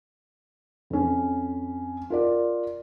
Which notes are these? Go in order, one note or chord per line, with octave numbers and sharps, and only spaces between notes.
F2 C#4
F4 A#4 D5